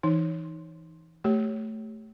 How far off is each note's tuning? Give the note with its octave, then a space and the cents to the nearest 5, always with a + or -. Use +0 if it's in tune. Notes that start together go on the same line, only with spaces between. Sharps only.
E3 +0 D#4 +0 C#5 +0
A3 +0 G4 -5 C#5 +0